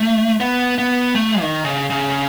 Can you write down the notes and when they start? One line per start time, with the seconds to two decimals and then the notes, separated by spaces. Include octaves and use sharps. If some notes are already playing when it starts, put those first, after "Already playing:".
Already playing: A3
0.40 B3
0.78 B3
1.15 A3
1.41 D#3
1.64 C#3
1.90 C#3